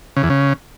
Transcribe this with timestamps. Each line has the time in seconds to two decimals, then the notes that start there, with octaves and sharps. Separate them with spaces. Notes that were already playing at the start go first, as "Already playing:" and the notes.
0.17 C#3
0.23 E2
0.30 C#3